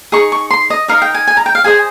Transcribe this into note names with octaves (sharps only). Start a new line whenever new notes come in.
D#4 G#4 C#6
C#6
C6
D#5
D#4 A#4 D#5 F5
G5
G#5
G#5
A#5
G5
F5
G#4 C5 D#5 G#5